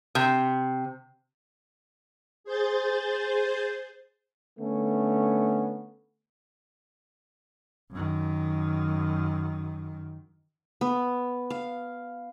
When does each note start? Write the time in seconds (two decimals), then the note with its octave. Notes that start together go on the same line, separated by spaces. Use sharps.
0.15 C3
2.44 G#4 C5 G6 A6
4.59 D3 A3 B3 C#4
7.91 F#2 D#3
10.81 B3
11.50 F5